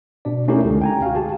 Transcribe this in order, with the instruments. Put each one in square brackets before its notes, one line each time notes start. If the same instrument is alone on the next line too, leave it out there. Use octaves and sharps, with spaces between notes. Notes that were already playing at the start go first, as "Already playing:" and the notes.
[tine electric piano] B2 D4 D5
A3 C#4 D#4 E4 G4 A#4
C#2 D3 G#3
G5 G#5 A#5
F#4 F5
G4 G#4 A5